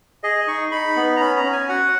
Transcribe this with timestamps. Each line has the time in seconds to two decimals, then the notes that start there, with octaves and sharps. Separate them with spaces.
0.23 G#4 D#5
0.47 D#4 C#6
0.71 D#4 B5
0.96 B3
1.16 A#5
1.20 C#4 B5
1.37 A#5
1.45 C#4
1.53 G#5
1.69 F#4 F#5